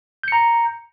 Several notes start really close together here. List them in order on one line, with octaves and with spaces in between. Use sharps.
G6 C#7 A#5